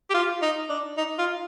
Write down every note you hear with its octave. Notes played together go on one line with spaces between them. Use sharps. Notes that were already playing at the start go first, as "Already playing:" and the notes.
G4
F4
D#4
D4
D#4
F4